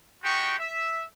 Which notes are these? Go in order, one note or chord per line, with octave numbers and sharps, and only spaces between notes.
G#3 D#4 F#4 G4 G5 C#6
E5